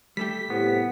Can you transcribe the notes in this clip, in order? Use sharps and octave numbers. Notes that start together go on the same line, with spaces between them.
G3 A3 G4 B6
A2 C3 B3